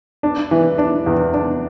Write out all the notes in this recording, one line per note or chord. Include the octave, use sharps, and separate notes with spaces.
D4
E3
D4
E2
D4